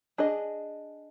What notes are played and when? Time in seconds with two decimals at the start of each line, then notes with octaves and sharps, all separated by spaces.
0.18 D4 G#4 D#5